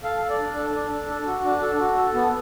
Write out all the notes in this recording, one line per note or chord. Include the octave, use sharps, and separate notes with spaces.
A4 F5
A4
D5
D4
A4
D4
D4
A4
F#4
D4
A4
F#4
A4
B3